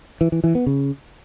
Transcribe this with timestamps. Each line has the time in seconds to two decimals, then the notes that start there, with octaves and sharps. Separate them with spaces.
0.21 E3
0.32 E3
0.44 E3
0.55 B3
0.66 C#3